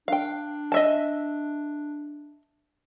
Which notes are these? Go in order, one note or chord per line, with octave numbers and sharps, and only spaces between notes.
D4 F5 G5
D#5 E5 A5